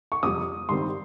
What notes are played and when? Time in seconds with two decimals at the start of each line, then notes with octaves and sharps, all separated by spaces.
0.12 C#6
0.23 F2 C3 G3 D#6
0.69 G2 D#3 G3 C4 C6